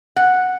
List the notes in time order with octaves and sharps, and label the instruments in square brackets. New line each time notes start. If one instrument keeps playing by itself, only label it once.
[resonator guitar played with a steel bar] F#5